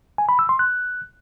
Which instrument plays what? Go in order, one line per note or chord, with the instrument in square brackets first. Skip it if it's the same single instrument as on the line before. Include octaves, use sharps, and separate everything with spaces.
[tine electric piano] G#5
B5
E6
C6
F#6